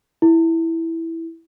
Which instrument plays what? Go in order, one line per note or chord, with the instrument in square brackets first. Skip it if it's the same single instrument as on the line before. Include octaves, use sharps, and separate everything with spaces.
[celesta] E4